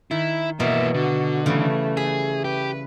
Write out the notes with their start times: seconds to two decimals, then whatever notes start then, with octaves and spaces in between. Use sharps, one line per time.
0.11 D#3 E4
0.60 B2 E3 A#3 E5
0.94 D3 F#4
1.46 C#3 E3 G3 A3
1.97 G#4 E5
2.44 G4 B4